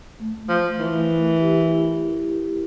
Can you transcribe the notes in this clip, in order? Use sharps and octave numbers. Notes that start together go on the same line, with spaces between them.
A3
F3 A3
E3 A3
A#4
G4
E4
G4
G4